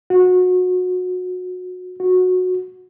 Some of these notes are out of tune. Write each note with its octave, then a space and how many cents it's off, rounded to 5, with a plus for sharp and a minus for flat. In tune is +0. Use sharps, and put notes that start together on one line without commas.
F#4 -25
F#4 -15